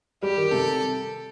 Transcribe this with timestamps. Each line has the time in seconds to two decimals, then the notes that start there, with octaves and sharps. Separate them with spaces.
0.23 G3 G4
0.37 D#3
0.51 C3 A4